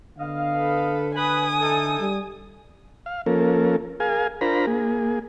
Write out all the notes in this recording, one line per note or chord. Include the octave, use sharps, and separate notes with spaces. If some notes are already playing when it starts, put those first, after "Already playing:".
D3 B3 D#5 F5
A4 B4
B4 G#5 D#6
E3 D#4 A4
G3
F5
F3 A#3 C#4 A4 A#4
G#4 A#4 F5 G#5
D4 F4 A#4 C5 A#5 B5
A#3 G#4